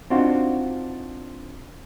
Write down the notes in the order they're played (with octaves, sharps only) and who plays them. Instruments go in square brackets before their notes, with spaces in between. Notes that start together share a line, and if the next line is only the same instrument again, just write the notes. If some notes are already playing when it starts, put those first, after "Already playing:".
[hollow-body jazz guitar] C4 D4 D#4 F4 F#4